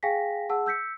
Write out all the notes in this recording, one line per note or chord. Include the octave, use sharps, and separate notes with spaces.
G#4 F5 G5 G#5 A#6 B6
G#4 F#5 A5 E6
E6 G6 B6 C#7